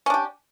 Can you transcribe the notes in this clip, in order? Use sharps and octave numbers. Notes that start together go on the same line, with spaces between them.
C#4 D4 G4